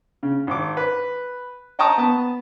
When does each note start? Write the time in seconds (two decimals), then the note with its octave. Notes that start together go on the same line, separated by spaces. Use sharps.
0.23 C#3
0.47 G#1 D6
0.77 B4
1.79 D#5 G5 A5 A#5 C#6 D#6
1.98 B3 A5